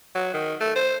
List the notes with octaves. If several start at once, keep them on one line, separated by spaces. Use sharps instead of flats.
F#3
D#3
A3
C5